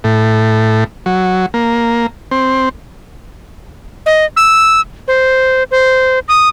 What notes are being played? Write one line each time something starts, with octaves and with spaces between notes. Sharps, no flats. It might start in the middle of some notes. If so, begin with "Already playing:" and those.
A2
F#3
A#3
C4
D#5
E6
C5
C5
D#6